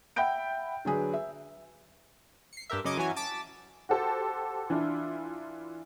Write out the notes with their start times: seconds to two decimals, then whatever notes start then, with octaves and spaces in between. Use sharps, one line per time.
0.16 E5 F#5 G5 B5 G6 D7
0.85 D3 F#3 G#4 B4
1.14 E5
2.53 C7 C#7
2.70 G2 G4 A#4 E5
2.85 F#2 C#3 D#5 D6 G#6
2.97 E3 F#3 C#4 G#5
3.16 A5 D6 A6 B6
3.89 F#4 G4 A4 C5
4.70 E3 D4 E4 F4